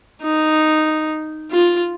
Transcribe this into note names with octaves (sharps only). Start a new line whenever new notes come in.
D#4
F4